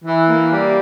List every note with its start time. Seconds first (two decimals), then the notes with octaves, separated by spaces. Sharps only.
0.04 E3
0.28 A#3
0.52 G3